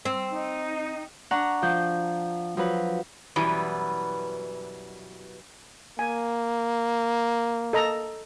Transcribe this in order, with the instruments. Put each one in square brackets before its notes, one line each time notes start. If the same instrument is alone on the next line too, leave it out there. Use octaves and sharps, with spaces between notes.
[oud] C4
[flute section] D#4
[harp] D4 F#5 A#5 C#6
F3 G6
F3 F#3 B4
[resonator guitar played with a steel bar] F#2 B2 E3 G3 B3
[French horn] A#3 [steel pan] G#5
[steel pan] A4 D#5 A#5